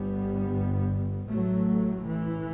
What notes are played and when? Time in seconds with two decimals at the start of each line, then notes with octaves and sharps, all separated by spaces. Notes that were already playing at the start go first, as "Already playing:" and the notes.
Already playing: G1 G2 G3 B3
1.29 A1 A2 F#3 A3
2.05 E3